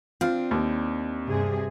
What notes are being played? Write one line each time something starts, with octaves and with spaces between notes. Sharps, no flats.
C4 D4 F4
D#2
G2 C3 G#4